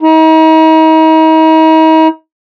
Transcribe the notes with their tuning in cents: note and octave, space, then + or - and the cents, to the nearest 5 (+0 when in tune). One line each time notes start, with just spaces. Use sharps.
D#4 +40